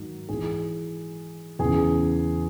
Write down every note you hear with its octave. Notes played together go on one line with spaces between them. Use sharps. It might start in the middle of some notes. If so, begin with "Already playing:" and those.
Already playing: G#2 D#3 F#3
G#2 E3 G#4
E2 C#3 E3 G#4